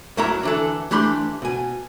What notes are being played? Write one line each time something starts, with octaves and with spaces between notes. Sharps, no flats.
F#2 F#3 E4 A#4 C#5 A#5
D3 E3 A4
E3 A3 D4 G4 B5 C6
B2 G#5